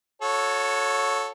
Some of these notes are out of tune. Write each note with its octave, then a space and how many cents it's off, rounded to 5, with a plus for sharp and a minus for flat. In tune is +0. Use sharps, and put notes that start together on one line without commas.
F#4 -40 A4 +0 C#5 +0